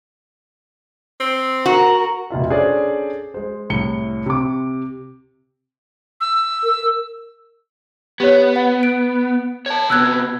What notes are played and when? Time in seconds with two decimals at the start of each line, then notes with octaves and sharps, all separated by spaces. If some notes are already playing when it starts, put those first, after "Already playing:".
1.20 C4
1.66 F#4 A#4
2.30 F1 B2 F4 E5
2.50 C#4 D4 G#4 A4 C5 D5
3.34 G#3 C5
3.70 C2 A2 C#7 G7
4.26 C3 D6
6.21 E6
6.64 A#4
8.20 B3 G4 C#5
8.56 F#5
8.83 D7
9.66 C#5 A5
9.90 C3 B3 E6 F#6 G#6